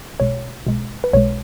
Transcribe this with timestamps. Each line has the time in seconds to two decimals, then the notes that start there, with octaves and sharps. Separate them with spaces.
0.20 B1 B2 G#3 C#5
0.66 B1 B2 G#3
1.04 B4
1.13 B1 B2 G#3 C#5